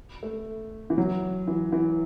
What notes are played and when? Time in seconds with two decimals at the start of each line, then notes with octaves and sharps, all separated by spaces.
0.23 A3
0.90 E3
0.98 F#3
1.48 E3
1.73 E3